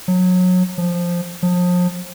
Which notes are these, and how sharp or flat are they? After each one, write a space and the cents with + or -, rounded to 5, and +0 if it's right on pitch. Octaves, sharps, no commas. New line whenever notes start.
F#3 -25
F3 +0
F3 +35